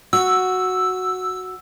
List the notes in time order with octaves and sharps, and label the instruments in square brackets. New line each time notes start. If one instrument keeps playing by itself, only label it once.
[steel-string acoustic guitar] F#4 [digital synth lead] E6